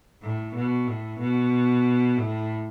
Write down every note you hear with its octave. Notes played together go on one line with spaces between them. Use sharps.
A2
B2
A2
B2
A2